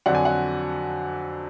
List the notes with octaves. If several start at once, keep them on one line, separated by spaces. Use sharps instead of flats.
F2 D3 F#3 D4 F#5
G#5
F#5